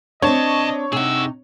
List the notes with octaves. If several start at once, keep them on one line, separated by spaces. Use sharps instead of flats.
B1 C4 D4 C#5 D#5 A5
C3 D#4 G#4 F#5 E6